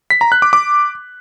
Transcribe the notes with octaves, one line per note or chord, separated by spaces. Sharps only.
B6
A#5
F#6
D6
D6